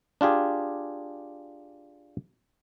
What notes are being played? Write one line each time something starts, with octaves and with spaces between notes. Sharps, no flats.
D4 F4 G4 G#4